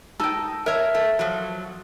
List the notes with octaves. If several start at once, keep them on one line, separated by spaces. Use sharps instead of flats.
D#4 A4 G5
A#4 C#5 E5
A3
F3 F#3